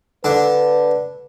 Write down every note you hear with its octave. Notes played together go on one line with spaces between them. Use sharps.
D3 D4 B4